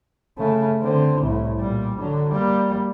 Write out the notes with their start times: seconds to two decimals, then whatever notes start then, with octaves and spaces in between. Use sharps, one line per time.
0.38 C#3 A3
0.82 D3 C4
1.21 C2 A2
1.59 A#2 G3
1.97 D3 F#3
2.30 G3 A#3